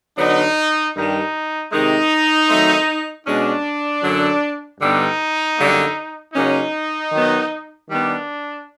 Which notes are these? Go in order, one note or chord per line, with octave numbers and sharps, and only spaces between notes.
D3 F#3 B3 D4 D#4
G2 D#3 G3 D#4
C3 D#3 G#3 D#4
D#3 F#3 A3 C4
B2 G#3 C#4 D4
F#2 D3 F#3
G2 D3 G3 B3 D4 D#4
F#2 D3 G3 A#3
C#3 F#3 A#3 C#4 D#4
D#3 F#3 B3
D#3 G3 B3 D4